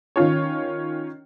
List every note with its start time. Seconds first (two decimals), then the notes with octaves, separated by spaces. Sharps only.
0.16 D#3 C#4 F4 C#5